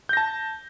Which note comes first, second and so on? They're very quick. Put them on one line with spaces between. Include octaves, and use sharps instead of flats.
G6 A#6 A5